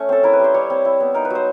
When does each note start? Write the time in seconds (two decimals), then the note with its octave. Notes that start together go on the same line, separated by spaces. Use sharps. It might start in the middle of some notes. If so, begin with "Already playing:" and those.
Already playing: A3 C#4
0.09 C4 A4
0.23 E4 A#4
0.33 B4
0.40 G3 C5
0.54 G3 C#5
0.70 C4
0.85 E4
1.00 B3
1.14 D#4 A#4
1.25 B4
1.30 F#3 C5